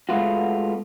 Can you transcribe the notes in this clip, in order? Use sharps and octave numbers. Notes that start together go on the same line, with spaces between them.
G#3 A3 B3 F4 F#4